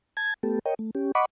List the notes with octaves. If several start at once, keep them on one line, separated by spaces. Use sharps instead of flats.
A5 G#6
A3 B3 G4 A4
A#4 C#5 D#5 G5
A3
C#4 G4
D#5 F#5 B5 C#6 D6